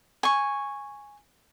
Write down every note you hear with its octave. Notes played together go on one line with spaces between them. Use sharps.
G#5 C#6